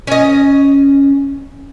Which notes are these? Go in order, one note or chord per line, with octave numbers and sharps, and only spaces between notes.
C#4 D#5